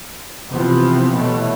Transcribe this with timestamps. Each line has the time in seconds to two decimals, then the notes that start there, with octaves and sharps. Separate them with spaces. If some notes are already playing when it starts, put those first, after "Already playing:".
0.51 C3 E3 F3 B3
1.13 B2 E3 F#3 A3